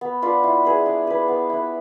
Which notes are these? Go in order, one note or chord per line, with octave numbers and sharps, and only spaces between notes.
B3
D4 F4 B4
E4
G#4 B4
D4
G#4 B4
B3
E4 B4